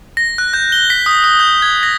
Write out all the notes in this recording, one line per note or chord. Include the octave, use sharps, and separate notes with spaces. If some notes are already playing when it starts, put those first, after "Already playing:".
A#6
F#6
G6
G7
B6
D#6
D#6
G6
G#6
A#6